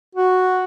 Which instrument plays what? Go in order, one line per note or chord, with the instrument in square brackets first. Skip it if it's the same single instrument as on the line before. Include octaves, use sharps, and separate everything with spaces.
[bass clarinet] F#4